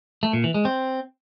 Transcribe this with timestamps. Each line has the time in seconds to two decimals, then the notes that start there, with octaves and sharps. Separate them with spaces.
0.23 A3
0.33 A#2
0.44 E3
0.54 G#3
0.65 C4